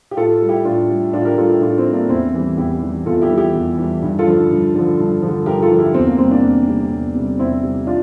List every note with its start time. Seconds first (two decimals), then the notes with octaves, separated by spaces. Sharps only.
0.11 G4
0.17 A2 F4 A4
0.42 G3
0.49 E4 G4
0.65 A2 D4 F4
0.90 G3
1.13 A2 D4 F4
1.25 G4 A#4
1.37 G3 F4 A4
1.50 E4 G4
1.61 A2 D4 F4
1.77 C4 E4
1.86 G3
1.93 A#3 D4
2.09 E2 C4 E4
2.34 E3 G3
2.58 E2 E4 G4
2.82 E3 G3
3.06 E2 F4 A4
3.21 E4 G4
3.30 E3 G3
3.38 E4 G4
3.55 E2
3.78 E3 G3
4.02 G2
4.19 F4 A4
4.26 D3 F3
4.51 G2
4.75 D3 F3
4.99 G2
5.23 D3 F3
5.46 G2 G4 A#4
5.62 F4 A4
5.71 D3 F3
5.78 E4 G4
5.94 E2 C4
6.07 A#3
6.18 C3 G3 C4
6.31 A#3 D4
6.43 E2
6.68 C3 G3
6.92 E2
7.15 C3 G3
7.39 E2 C4 E4
7.63 C3 G3
7.87 D4 F4